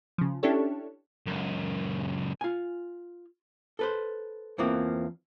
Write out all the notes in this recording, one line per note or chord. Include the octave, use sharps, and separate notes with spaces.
C#3 F3
C#4 D4 E4 G4 A4 C#5
C#2 F#2
F4 G#5
A4 B4 C5
E2 E3 F3 A#3 C4